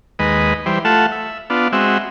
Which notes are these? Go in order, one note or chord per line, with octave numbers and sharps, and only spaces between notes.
D#2 G#3 B4 D#5
E3 G3 C5
A3 F4 A4 E5 F#5
E5
B3 D4 F4
G#3 C4 F#4 E5